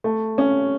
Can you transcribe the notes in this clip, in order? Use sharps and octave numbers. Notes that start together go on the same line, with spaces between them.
A3
C#4